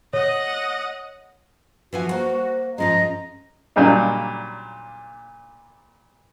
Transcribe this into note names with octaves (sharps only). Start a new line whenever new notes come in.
C#5 D#5 F#5
E3 F3 F#4 G#5
A#3 C5
G#2 F3 G#3 C#4 D#5 A#5
A#2 C#3 F#3 G3 D4 D#4